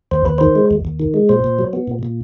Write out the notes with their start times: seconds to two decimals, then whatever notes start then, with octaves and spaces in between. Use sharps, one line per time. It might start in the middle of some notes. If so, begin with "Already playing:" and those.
0.11 D#2 C5
0.25 D#2 B4
0.38 D#3 C5
0.56 G#3
0.71 D#2
0.85 D#2
1.00 D#3
1.14 G#3
1.29 A#2 C5
1.44 A#2
1.59 F#3
1.73 B3
1.88 A#2
2.03 A#2